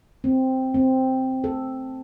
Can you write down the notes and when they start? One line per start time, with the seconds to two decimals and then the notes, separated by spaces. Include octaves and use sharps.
0.24 C4
0.74 C4
1.44 A4